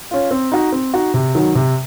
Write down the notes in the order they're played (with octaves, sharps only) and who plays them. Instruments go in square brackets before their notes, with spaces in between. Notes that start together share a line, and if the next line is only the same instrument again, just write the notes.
[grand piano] C#4 F4
C4
D#4 F#4
C4
D#4 F#4
C3
D#3 F#3
C3